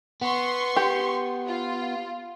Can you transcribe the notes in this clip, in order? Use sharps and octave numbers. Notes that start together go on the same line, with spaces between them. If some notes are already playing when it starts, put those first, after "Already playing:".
B3 C6 C#6
G4
F4